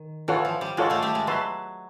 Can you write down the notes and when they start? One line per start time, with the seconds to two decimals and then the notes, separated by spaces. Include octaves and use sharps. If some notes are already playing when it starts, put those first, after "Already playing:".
Already playing: D#3
0.28 E3 F4 A4 C#5 F#5
0.45 F3
0.61 G3
0.77 G#3 F4 A4 C#5 F#5
0.90 G3 A3
1.02 G3 A3
1.15 G#3
1.27 F#3 B4 E5 A5 C6